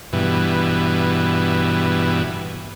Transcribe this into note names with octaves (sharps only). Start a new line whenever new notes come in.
G2 B2 E3